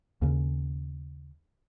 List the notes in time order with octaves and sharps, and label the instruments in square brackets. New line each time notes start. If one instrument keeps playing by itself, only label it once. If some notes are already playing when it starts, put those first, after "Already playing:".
[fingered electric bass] D#2 C#3